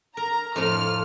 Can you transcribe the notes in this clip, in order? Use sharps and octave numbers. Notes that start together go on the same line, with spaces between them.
A#4 A#5
F2 A2 F3 F6